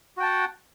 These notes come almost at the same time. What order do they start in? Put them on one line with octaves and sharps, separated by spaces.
F#4 G5 A5 F#5